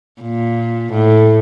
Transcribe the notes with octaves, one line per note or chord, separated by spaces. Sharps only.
A#2
A2